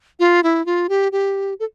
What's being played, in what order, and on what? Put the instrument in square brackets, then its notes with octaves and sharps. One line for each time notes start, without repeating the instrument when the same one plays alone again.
[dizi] F4
E4
F4
G4
G4
A4